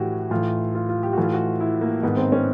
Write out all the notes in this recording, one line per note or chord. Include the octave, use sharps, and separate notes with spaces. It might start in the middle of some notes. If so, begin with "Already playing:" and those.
Already playing: A2 E3 F#4 G4
A2 E3 F4
F4
F4
G4
A2 E3 F#4
F4
F#4
E4
A#3
G#2 D#3 B3
C4
C#4